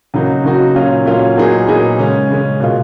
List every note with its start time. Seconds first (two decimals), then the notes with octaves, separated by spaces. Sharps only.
0.14 C#3 F#3 A#3 D#4 F#4
0.44 C#3 F#3 A#3 D#4 F#4
0.74 A#2 F#3 C#4 F4
1.05 A#2 F#3 C#4 F4
1.37 A#2 F#3 B3 D#4 G#4
1.68 A#2 F#3 B3 D#4 G#4
1.99 C#3 G#3 C#4
2.30 C#3 G#3 C#4
2.60 B2 A#3 F4